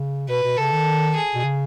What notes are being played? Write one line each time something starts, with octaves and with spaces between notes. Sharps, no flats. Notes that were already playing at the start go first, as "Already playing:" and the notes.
Already playing: C#3
B2 B4
B2
C#3 A4
D#3
G#4
B2
C#3